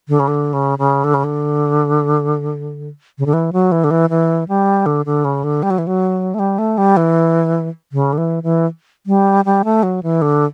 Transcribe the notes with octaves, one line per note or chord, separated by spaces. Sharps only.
D3
C#3
D3
C#3
C#3
D3
C#3
D3
C#3
D3
E3
F#3
E3
D3
E3
E3
G3
D3
D3
C#3
D3
G3
F#3
E3
F#3
A3
G3
A3
G3
E3
C#3
D3
E3
E3
G3
G3
A3
F#3
E3
D3